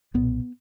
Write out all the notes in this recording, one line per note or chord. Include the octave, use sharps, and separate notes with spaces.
B1 A#2 B3